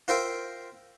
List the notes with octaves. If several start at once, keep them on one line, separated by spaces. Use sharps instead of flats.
F4 A#4 C5 E5 G5